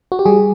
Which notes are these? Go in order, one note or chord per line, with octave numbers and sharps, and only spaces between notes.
F#4
G4
G3 G#4